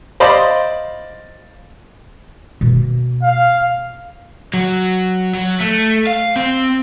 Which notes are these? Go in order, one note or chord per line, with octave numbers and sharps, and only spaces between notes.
C5 D5 D#5 F5 B5 C6
B2 A#3
F5
F#3
F#3
A3
F5
C4